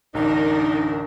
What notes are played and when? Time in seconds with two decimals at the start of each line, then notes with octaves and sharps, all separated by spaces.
0.15 A1 D2 D4 D#4 A#4